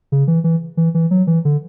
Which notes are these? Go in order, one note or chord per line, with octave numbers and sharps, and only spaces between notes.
C#3
E3
E3
E3
E3
F#3
E3
D3